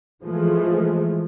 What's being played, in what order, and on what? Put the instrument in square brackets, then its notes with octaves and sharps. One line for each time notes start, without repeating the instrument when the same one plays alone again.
[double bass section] E3 F3 G#3 A3